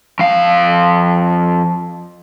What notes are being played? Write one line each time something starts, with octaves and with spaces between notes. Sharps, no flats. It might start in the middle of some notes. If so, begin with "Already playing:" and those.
F2 F5